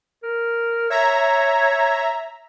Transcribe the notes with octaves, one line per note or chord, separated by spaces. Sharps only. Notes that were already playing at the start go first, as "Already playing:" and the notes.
A#4
C#5 E5 A#5